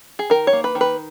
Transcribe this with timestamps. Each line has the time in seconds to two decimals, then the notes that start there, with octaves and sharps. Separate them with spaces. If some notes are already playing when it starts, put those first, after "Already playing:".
0.19 G#4
0.30 D#3 A#4
0.47 C#5
0.53 A#3
0.64 B4
0.75 D#3
0.81 B4